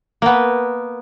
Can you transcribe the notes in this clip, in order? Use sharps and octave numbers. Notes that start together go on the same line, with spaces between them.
A#3 B3